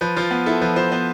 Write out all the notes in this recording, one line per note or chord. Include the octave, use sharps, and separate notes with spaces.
F3 B4
F3 F4
B3
E4 A4
F3 B4
F3 C5
B3 C5